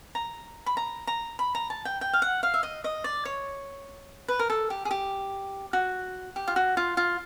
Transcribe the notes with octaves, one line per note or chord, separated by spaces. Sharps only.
A#5
B5
A#5
A#5
B5
A#5
A5
G5
G5
F5
F#5
F5
E5
D#5
D#5
D5
C#5
B4
A#4
A4
G4
G#4
G4
F#4
G4
F4
F#4
F4
F4